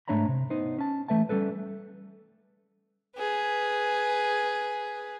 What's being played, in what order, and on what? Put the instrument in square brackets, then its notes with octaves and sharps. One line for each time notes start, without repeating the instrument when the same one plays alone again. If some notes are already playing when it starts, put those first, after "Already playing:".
[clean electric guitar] G#2 A3 D4 C#5 A#5 B5
C3
B3 D#4 C5
C#4 A5
E3 A3 B4 E5 A5
G3 C#4 A4 B4
[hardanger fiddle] G#4 B4